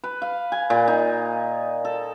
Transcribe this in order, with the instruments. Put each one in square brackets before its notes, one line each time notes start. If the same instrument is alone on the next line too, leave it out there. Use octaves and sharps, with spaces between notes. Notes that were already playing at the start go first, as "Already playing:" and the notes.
[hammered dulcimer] B4
F5
G#5
A#2
D#4
A4